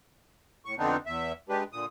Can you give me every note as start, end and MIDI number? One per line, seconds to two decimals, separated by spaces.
0.65 0.75 45
0.65 0.75 85
0.78 0.97 41
0.78 0.97 50
0.78 0.97 59
0.78 0.97 60
0.78 0.97 62
0.78 0.97 63
1.06 1.32 40
1.06 1.32 76
1.49 1.63 56
1.49 1.63 62
1.49 1.63 67
1.49 1.63 71
1.73 1.86 46
1.73 1.86 50
1.73 1.86 87